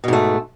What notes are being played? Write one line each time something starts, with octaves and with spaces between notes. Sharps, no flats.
G#2 B2 A3